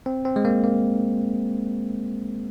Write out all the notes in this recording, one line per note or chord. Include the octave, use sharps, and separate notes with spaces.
C4
C4
G#3
A#3
A#3